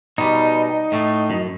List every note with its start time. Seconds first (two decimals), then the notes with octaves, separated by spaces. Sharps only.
0.18 B2 G3 D#4
0.92 A2 A3
1.30 F#2